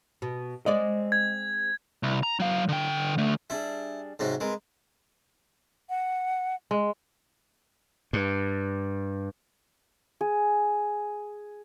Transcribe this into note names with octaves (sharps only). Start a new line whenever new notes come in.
B2
G#3 C4 D5 D#5
G#6
C2
A#5
F#3 F5
D3 G5
D3 A3
G3 D4 E4 G#4
G#2 C3 F#3
G#3 C4 A#4 B4
F#5
G#3
G2
G#4